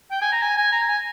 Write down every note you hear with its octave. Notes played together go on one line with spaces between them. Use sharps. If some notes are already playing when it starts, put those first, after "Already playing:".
G5
G#5
A#5
G#5
G#5
A#5
G#5